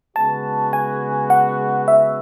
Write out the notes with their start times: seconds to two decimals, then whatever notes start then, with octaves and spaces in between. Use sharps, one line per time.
0.15 C#3 G#3 B3 F#4 A5
0.73 G#5
1.30 F#5
1.88 E5